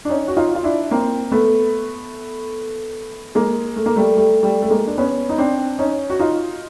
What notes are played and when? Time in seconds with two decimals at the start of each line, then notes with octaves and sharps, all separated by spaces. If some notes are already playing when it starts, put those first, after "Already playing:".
0.05 D4
0.09 C#4 D#4
0.28 F#4
0.37 D#4 F4
0.55 F4
0.64 D4 E4
0.91 A#3 C4
1.32 A3 B3
3.35 G#3 A#3
3.76 A3
3.86 A#3
3.96 G3 A3
4.17 G3 A3
4.43 G3 A3
4.62 A3
4.70 G#3 A#3
4.87 D4
4.98 B3 C#4
5.29 D#4
5.38 C4 D4
5.79 C#4 D#4
6.10 F#4
6.19 D#4 F4